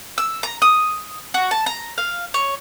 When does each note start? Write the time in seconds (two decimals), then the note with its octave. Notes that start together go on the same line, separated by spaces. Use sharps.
0.18 E6
0.43 A#5
0.62 D#6
1.34 F#4
1.51 A5
1.66 A#5
1.98 F5
2.34 C#5